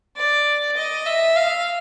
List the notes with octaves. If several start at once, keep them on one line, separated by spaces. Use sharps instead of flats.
D5
D#5
E5
F5